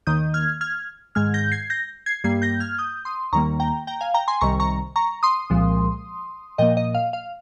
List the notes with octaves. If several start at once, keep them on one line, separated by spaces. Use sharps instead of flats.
D#2 D#3 A#3 D#6 G6
F6 G#6
F6 G#6
G#2 D#3 G#3 F6 G#6
G6 A#6
G#6 C7
G6 A#6
G#6 C7
G2 G3 A#3 G#6 C7
G6 A#6
F6 G#6
D#6 G6
C6 D#6
D#2 D#3 G3 A#3 A#5 C#6
G5 A#5
G5 A#5
F5 G#5
G5 A#5
G#5 C6
C2 C3 D#3 G3 A#5 C#6
A#5 C#6
A#5 C#6
C6 D#6
C2 A#2 F3 G#3
A#2 F3 A#3 D#5 G5
D#5
F5
F5